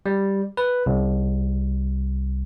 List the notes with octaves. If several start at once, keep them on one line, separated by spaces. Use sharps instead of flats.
G3
B4
C2